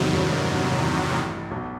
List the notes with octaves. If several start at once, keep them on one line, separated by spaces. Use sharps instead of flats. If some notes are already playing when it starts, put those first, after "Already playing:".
Already playing: A1 E2 A2 C3 D#3 F#3
G2
G2
G2
A1 A2
A1 A2
B1 B2